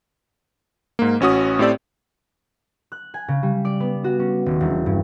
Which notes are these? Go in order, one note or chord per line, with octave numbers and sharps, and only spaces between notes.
G#2 A#3
A1 C#4 F#4 D#6
A2 C4 G4 D5 E6
F#6
G#5
C#3
G3
D5
B3
F#4
C#4
D#1
E1
G2